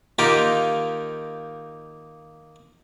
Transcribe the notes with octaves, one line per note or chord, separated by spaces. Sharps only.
D#3 A#3 D#4 F4 G4 A#4